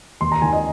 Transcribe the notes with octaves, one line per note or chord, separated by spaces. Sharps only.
D#2 C6
A#5
D#3 G#5
D#5